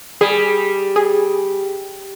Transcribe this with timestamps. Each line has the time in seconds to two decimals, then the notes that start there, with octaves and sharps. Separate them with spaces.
0.21 G3 G#4
0.96 G#4